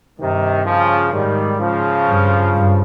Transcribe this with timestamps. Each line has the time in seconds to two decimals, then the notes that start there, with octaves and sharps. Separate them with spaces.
0.19 G2 C3 D#3
0.66 C#3 F3
1.12 G#2 D#3 G3
1.59 C#3 F3
2.06 G2
2.52 G2